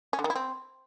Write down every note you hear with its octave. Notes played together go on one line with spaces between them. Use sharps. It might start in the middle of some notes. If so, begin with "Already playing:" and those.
C#4
D3
D#3
E4
C4